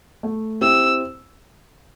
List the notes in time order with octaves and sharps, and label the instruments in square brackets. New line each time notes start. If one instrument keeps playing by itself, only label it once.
[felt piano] A3
[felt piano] C4 E4 G4 C5 [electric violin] E6